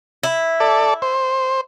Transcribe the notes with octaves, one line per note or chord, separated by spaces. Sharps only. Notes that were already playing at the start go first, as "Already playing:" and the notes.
E4
A4 D5
C5